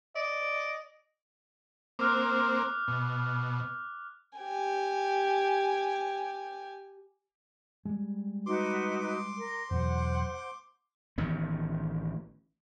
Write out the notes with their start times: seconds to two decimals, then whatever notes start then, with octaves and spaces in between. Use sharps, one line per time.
0.16 D5 D#5
1.99 A#3 C4 D6 F6 F#6
2.88 B2
4.39 G4 G#5
7.85 G3 G#3
8.46 D#4 F#4 B4 C6 D6
9.38 A#4
9.71 E2 B2 F#3 C5 F#5
11.18 A1 D#3 B3